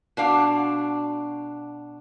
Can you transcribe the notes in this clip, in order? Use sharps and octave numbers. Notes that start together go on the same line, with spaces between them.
B2 D4 F5